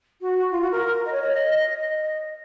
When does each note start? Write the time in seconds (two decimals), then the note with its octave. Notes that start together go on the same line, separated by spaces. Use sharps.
0.20 F#4
0.51 F4
0.60 F#4
0.71 A#4
1.05 D#5
1.12 C#5
1.21 D#5
1.32 D#5
1.73 D#5